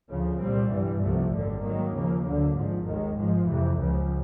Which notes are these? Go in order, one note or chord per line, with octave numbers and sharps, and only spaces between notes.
D2 C#3 F3
C2 A#2 G3 C4
G2 E3 G3
C2 C3 F3 A3
G#1 F#2 D3 G3
G#2 D#3 F#3 A#3
D#2 C#3 F3 A#3
D2 D3 F#3
G#1 G#2 F3
D#2 D#3 G#3
G#2 F3 G#3
F2 C3 E3
C#2 C#3 F3